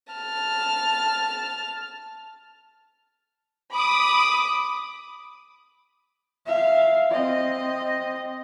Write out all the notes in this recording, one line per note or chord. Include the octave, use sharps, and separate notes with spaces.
A5 F6
B5 D6 D#6
E5 F5
C4 D#5